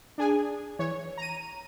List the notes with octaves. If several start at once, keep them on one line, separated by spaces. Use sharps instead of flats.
D4 G#4 G#5
E3 C#5
A#5 D#7